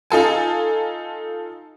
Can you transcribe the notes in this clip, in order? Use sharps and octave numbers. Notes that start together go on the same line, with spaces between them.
D#4 F4 A4 G#5